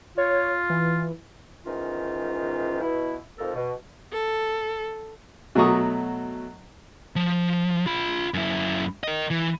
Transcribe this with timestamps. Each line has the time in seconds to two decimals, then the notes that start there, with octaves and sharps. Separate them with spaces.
0.18 F4 C#5
0.70 E3
1.66 E2 G#2 D#3 C#4 F4
2.81 B2 E4
3.39 F2 G#2 F3 A4 A#4
3.55 B2
4.12 A4
5.55 B2 F#3 A3 A#5 C#6 D#6
7.16 F3
7.86 F4 B5
8.34 F#2 E4
9.04 A#4 D#5
9.30 E3